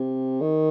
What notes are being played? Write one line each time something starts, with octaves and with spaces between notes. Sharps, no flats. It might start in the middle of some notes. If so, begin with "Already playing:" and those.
Already playing: C3
D#3